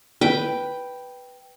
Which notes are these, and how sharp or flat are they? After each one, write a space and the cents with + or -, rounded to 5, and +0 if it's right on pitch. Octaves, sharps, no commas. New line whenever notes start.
B4 +0 G5 +0